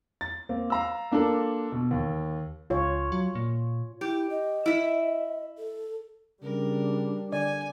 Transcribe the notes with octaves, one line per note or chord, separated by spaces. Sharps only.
A6
A#3 C4
F5 A#5 E6
A#3 D4 F4 A4 A#4
B2
D#2
C#2 F4 C#5
F#3
A#2
E4 G4
D#5
E4 E5
A4
C#3 G3 D4 A#4
D3 D5 G#5